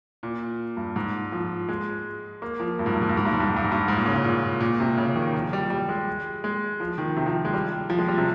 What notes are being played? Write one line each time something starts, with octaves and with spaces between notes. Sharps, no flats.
A#2
G2
G#2
F3
G#3
A#3
F3
G2
G#2
G2
G#2
G2
G#2
G2
G#2
G2
G#2
G2
G#2
G2
G#2
A#2
C#3
C#3
A#2
A#2
C3
C#3
D#3
F3
G3
G3
G#3
G#3
F3
D#3
C3
F3
G#3
G3
F3
G#3
G3
C3